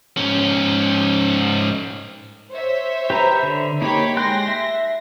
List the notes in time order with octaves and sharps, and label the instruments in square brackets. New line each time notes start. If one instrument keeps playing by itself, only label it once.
[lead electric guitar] G#2 C#4
[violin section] C5 C#5 E5
[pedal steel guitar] G4 B4 A#5
D3
[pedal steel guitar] A#3 D#4 [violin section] G4 C#5 B5
[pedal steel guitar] G#3 G5 F#6 [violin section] C6 A#6
[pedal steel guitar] E5